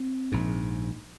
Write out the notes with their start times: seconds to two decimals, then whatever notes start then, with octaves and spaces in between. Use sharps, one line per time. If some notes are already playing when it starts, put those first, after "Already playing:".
Already playing: C4
0.32 A#1 G#2